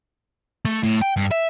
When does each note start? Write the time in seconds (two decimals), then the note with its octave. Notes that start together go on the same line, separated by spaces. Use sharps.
0.65 A3
0.83 A2
1.01 G5
1.17 G2
1.31 E5